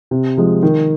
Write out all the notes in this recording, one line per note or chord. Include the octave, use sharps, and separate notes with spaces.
C3
F3 G#3
D#3